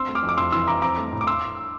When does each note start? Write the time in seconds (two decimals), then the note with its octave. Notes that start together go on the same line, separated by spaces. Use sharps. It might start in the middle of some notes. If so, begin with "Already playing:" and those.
Already playing: C4 C6 E6
0.09 A3
0.15 D6 F6
0.23 F2
0.29 D6
0.37 F2 C6 E6
0.52 E3 C6 E6
0.68 F2 A#5 D6
0.82 C4 A#5 D6
0.97 A3
1.12 A2
1.21 D6
1.27 C6 E6